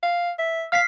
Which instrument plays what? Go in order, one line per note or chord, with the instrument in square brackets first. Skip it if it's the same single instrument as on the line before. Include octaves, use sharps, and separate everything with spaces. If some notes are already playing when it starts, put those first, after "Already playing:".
[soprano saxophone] F5
E5
[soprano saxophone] F5 [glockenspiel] F6 B6 C7